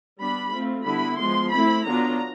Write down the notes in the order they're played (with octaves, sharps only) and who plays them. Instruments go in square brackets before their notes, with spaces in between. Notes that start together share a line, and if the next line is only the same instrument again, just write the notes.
[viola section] G3 B3 D4 B5
A3 C4 F4
D3 G3 B3 E4 B5
F3 G#3 B3 C6
A3 C4 E4 B5
D3 F#3 B3 D4 F4 A#5